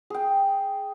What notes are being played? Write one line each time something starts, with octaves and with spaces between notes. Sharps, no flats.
G#4 G5